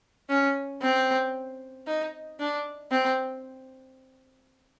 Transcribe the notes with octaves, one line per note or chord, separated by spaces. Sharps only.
C#4
C4
D#4
D4
C4